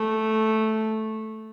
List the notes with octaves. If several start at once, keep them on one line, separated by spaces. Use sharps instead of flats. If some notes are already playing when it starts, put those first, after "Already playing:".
Already playing: A3